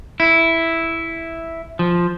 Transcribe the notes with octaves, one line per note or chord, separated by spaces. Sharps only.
E4
F3